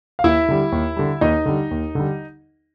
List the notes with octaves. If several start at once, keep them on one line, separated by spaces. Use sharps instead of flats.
F5
D#2 E4 E5
D3 G3
D#2
D3 G3
D#2 D#4 D#5
D3 G3
D#2
D3 G3